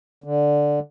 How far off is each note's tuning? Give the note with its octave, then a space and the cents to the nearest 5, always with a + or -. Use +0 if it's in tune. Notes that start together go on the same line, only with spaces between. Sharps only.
D3 +0